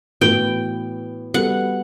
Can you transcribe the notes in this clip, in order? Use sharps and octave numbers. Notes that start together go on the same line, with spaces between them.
A2 E3 B3 F#4 G5
G3 B3 F#4 A4 F#5